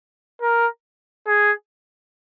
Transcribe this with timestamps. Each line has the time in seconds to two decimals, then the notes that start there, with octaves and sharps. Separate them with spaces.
0.41 A#4
1.27 G#4